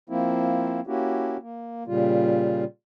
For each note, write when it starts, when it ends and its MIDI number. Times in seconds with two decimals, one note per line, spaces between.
0.09 0.80 53
0.09 0.80 58
0.09 0.80 60
0.09 0.80 64
0.87 1.37 58
0.87 1.37 61
0.87 1.37 64
0.87 1.37 66
0.87 1.37 67
1.42 1.83 58
1.87 2.64 46
1.87 2.64 49
1.87 2.64 55
1.87 2.64 65